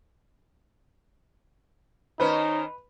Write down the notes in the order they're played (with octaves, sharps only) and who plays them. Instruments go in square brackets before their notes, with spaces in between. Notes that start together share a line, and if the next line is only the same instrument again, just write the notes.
[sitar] D#3 C#4 C5 [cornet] D#4 [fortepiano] B4